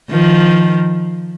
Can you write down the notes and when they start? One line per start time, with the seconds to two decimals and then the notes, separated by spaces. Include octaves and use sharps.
0.10 D#3 F3